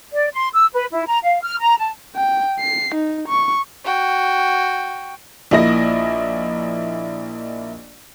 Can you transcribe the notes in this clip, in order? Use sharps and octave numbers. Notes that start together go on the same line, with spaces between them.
D5
C6
E6
B4
E4
A#5
F5
F6
A#5
A5
G5
C7
D#4
C#6
F#4 G5
A#1 A#3 E4 D#5 A#6